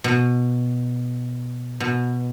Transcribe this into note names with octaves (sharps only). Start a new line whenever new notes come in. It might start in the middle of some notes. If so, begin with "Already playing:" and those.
B2
B2